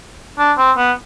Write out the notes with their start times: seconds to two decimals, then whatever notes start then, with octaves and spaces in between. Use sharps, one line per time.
0.39 D4
0.58 C4
0.78 B3